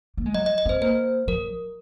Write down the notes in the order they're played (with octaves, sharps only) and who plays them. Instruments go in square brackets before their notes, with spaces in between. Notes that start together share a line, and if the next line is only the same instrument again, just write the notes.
[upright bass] A#3
G#3
[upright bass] F#3 [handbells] D#5
[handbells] D#5
D#5
[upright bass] C4 [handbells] C5
[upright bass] A#3 [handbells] C5
[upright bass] F#3 [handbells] A#4